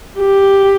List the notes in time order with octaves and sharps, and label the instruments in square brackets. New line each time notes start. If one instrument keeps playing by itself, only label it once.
[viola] G4